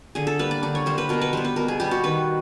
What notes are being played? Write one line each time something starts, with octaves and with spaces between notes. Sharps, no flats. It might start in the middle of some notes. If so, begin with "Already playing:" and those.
D3 G#4
A4
G3 A#3 B4
D5
D3 D5
C#5
G3 A#3 C5
B4
B2 A#4
B4
G3 B3 C5
B4
B2 A#4
G#4
G3 B3 G4
F#4
D#3 B4